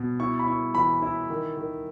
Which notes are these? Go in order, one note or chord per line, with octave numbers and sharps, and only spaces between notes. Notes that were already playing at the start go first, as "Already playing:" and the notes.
Already playing: B2
E4 C#6
B5
E4 C#6
E3 B5
E4
D#3
D#3